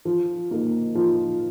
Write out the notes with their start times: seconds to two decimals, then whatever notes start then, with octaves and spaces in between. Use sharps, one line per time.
0.05 F3
0.51 A#3 D#4
0.95 F3